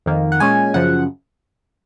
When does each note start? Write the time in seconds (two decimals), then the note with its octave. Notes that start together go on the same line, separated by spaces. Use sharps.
0.06 F2 D#3 A#3
0.32 F#5
0.40 A#2 G#3 C#4 G#5
0.74 F#2 C#3 F3 F#5